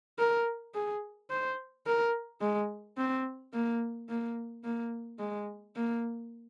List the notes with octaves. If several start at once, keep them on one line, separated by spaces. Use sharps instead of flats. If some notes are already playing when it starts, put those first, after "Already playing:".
A#4
G#4
C5
A#4
G#3
C4
A#3
A#3
A#3
G#3
A#3